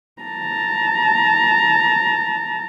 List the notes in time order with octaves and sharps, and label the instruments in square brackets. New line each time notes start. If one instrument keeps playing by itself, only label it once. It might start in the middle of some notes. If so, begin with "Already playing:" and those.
[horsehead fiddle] A5 A#5